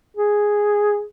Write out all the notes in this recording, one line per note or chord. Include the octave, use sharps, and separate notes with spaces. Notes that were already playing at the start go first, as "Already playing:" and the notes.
G#4